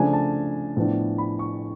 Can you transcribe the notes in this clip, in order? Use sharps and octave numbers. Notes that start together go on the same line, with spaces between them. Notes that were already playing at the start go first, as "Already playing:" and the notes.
Already playing: C#3 F3 A3 D4 G#5
A5
A2 F3 B3 D4
B5
C#6